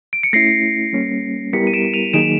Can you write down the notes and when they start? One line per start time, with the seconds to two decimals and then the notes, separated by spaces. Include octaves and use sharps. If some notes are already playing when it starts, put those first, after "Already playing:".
0.13 D7
0.23 C#7
0.33 A3 C#4 E4 A#6 C7
0.93 G3 A#3 C#4
1.53 G3 B3 E4 G4 A#4 B6 C#7
1.67 D#7
1.73 D7 E7
1.94 D#7 F7
2.13 D#3 F#3 A#3 D#4 G#4 D7 E7